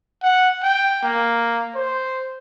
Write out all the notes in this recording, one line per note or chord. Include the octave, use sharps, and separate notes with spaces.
F#5
G5
A#3
C5